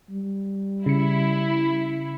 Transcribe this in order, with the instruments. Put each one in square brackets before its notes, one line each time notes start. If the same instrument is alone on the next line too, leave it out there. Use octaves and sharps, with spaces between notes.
[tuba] G3
[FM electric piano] C#3 C#7 [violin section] E4